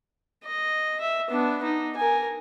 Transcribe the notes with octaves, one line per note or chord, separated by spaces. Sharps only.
D#5
E5
B3 D4
D#4
A#4 G#5